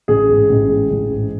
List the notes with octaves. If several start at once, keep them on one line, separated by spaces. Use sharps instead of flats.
A1 G#4
G#2
A1
G#3
A1
G#2